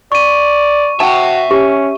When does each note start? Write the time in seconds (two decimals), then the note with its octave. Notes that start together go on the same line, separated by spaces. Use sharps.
0.12 D5 C#6 D#7
1.00 F#4 E5 G5 A5
1.51 C#4 G4